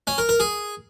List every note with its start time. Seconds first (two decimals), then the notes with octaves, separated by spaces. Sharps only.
0.07 C#4
0.18 A#4
0.29 A#4
0.40 G#4